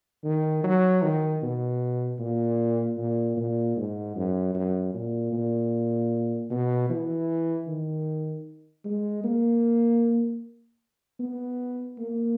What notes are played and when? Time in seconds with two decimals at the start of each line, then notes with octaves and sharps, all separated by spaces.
0.24 D#3
0.64 F#3
1.02 D#3
1.42 B2
2.19 A#2
2.98 A#2
3.37 A#2
3.77 G#2
4.16 F#2
4.54 F#2
4.94 A#2
5.33 A#2
6.50 B2
6.90 E3
7.68 D#3
8.85 G#3
9.24 A#3
11.20 B3
11.99 A#3